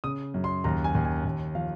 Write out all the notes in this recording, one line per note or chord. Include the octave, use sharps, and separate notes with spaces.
C#3 D#6
F#2
C6
D#2 A#5
G#5
D#2
G#5
D#2
F3 F5